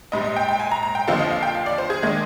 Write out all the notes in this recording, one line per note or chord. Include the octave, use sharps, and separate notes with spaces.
A#1 G#2 G3 D#5
D#5
G5
G5
G#5
A#5
A#5
G5
D#2 D3 F3 C4 D#4 F5
D#5
F5
G5
F5
D5
C5
G#4
D#3 G#3 D4